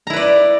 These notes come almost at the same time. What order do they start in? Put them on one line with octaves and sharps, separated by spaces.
A#5 E4 B4 D5